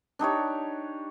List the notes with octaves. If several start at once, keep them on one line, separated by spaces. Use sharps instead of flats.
D4 D#4 G4 C#5